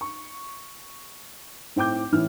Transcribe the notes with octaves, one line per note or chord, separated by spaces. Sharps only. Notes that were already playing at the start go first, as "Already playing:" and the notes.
C#6
A2 C4 G5 D6 G6
A2 E3 C#4 F6